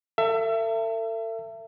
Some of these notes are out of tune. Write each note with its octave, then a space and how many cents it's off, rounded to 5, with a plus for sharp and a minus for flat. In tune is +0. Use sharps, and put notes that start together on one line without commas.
A4 +40 E5 +30